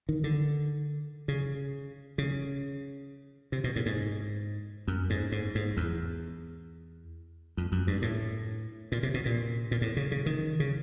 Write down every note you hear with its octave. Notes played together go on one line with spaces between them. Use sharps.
D#3
D3
C#3
C#3
C3
B2
A2
G#2
F#2
G#2
G#2
G#2
E2
F2
F#2
G2
A2
A#2
C3
B2
A#2
A#2
A2
C#3
C#3
D#3
C#3